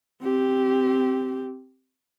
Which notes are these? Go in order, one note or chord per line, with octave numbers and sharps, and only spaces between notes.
C4 G4